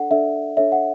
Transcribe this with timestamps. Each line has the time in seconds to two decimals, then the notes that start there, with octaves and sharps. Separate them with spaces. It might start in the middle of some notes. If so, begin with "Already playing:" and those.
Already playing: D4 A4 D5 F#5
0.11 D4 A4 D5 E5
0.57 D4 A4 C#5 E5
0.72 F#5